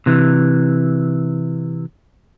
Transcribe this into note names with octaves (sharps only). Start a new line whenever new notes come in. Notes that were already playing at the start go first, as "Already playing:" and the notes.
C3 E3